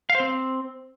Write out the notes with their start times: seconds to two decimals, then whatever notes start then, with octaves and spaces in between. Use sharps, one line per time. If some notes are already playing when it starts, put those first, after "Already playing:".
0.10 F5
0.15 C5
0.20 C4